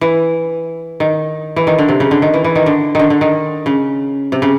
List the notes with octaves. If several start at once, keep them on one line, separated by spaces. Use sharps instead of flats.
E3
D#3
E3
D#3
D3
C3
C#3
D3
D#3
E3
E3
D#3
D3
D3 D#3
D3
D#3
C#3
C3
C#3